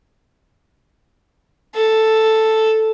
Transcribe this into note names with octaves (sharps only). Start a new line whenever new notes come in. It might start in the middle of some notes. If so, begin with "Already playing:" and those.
A4